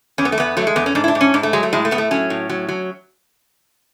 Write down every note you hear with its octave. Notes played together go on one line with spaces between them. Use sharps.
E2 C#4
B3
A3
E2 B3
F#3 A3
G#3
E2 B3
C#4
G#2 D4
E4
D4
G#2
C#4
G#2 D4
A3
F#3 G#3
A3
A2 G#3
A3
A2 B3
A3
F#3 C#4
A2
F#3
F#3